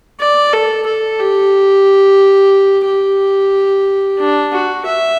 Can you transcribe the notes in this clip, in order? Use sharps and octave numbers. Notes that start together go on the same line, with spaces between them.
D5
A4
A4
G4
G4
D4
F#4
E5